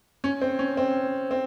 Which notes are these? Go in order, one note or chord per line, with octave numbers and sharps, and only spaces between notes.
C#4
C4
C#4
C4
C4